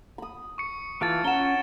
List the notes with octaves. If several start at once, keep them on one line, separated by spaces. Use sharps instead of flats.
B5 D#6
C#6 C#7
E3 F4 A5 E6 G#6 A6 D7
C#4 F#5 A#5 E7 G7